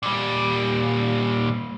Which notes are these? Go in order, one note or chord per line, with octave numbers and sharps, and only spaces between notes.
A#2 G3